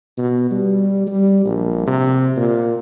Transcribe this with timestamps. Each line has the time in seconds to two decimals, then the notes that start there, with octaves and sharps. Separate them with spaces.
0.18 B2
0.51 G3
1.07 G3
1.45 A#1
1.87 C3
2.37 A#2